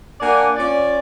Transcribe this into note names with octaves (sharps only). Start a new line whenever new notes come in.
A#3 D4 D5 F#5 G#5
C#4 F4 D5